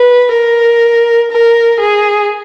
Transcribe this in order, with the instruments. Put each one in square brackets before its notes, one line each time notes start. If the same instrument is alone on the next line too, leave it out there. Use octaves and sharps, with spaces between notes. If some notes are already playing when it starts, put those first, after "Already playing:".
Already playing: [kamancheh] B4
A#4
A#4
G#4